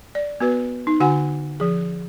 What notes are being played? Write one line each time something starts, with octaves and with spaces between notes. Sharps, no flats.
D5
B3 F#4 B4
D#4
D3 F#4 F#5 G#5
F3 G#4